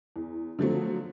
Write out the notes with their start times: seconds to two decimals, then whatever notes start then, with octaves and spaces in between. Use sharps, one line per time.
0.16 E2
0.59 D3 F3 F#3 A3 C4